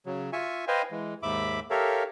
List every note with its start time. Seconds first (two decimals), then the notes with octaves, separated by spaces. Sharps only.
0.06 C#3 F#3
0.33 F4 E5 G#5 C#6
0.68 B4 C5 D#5 F5 G5 G#5
0.91 E3 G#3
1.23 D#2 G#2 E5 B5 D6
1.70 G4 A4 A#4 C#5 E5 F5